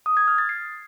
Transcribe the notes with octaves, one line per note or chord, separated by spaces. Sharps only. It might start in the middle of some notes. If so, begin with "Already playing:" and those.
D#6
G#6
F6
A6
C7